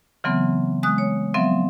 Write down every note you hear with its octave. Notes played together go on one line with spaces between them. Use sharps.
C#3 E3 F#3 A3 B3 C4
G#3 D#6 F#6
C#5
F3 F#3 B3 C4 E5